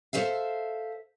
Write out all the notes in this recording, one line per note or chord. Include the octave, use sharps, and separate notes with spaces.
A4 C5 E5 F5